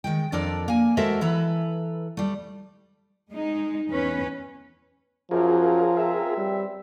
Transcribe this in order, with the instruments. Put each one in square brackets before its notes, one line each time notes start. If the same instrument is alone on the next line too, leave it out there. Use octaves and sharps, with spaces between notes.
[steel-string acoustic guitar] D#3 G#3 G5
F2 F3 D4 A4 A#4 D5
A#3 G#5
G#3 F#4 A4 A#4 C5 E5
E3 A4 B4 A#5
G3 A3
[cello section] G#3 D#4
E2 C#4 B4
[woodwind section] F#2 [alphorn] F3 [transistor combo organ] F4 G#4 A#4
[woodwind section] C#2 C4 E5
[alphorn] G3